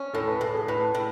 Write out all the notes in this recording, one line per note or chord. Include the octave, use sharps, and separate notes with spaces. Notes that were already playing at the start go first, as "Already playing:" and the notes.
Already playing: C#4
A2 A4
B4
A2 A4
G#4
A2 B4
A2